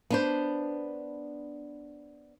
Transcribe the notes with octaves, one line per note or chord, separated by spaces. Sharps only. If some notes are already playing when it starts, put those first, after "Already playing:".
B3 D4 C5